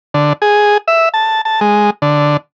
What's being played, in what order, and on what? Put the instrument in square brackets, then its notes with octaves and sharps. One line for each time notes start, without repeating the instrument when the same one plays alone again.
[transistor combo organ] D3
G#4
E5
A5
A5
G#3
D3